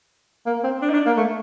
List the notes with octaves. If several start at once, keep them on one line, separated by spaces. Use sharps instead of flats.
A#3
C4
D4
D#4
D4
A#3
A3